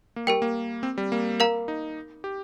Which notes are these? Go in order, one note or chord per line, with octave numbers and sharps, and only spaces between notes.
A#3
G3 G4 A#4 G5
A#3
C4
G3
A#3
A#4 F5 A#5
D#4
G4